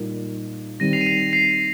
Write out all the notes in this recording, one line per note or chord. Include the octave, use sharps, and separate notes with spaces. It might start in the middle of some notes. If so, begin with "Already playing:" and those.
Already playing: A#2 G3 D#4 G4 A#4
D#3 G3 C4 A#6 D#7
C7 F7
D#7
C7 F7
C7 F7
C7